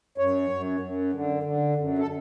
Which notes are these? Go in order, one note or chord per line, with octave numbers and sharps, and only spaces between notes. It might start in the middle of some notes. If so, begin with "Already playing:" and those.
F#2 C#5
F#2
F#2
D3
D3
F#2
A4